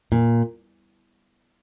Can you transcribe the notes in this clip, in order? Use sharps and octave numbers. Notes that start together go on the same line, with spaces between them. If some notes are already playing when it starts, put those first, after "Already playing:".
A#2